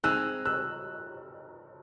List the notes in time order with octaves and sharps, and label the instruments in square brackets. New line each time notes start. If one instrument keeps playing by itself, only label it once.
[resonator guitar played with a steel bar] G#3 C4 D#4 G#4 [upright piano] E6 F#6
[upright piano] E6 F#6